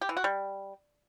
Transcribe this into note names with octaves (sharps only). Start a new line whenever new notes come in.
G4
E3
F#4
G3